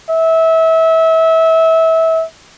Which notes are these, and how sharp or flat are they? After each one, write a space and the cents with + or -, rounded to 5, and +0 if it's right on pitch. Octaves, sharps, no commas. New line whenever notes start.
E5 -25